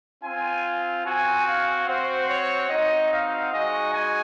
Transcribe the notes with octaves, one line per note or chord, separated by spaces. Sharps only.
C4 F4 G#5
C4 F#4 G#5
F5
C4 F#4 C5
C#5
C4 D#4 F#4 D#5
F5
G#3 D#4 F#4 D#5
G#5